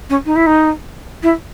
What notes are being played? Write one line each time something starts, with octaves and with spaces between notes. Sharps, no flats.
C#4
D#4
E4
D#4
E4